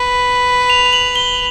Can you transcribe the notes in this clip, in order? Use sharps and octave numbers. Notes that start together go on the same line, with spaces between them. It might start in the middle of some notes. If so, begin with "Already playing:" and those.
Already playing: B4
F7
F7
F#7
G7